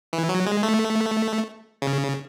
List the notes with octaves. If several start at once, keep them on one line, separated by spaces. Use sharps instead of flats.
E3
F#3
G#3
A3
C#3